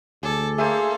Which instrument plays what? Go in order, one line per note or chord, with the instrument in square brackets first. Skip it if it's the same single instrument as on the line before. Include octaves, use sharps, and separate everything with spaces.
[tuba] D2 [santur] G#4 D5 [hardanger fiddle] A4
[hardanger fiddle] A#3 A4 [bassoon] G#4 [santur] C5 C#5 E5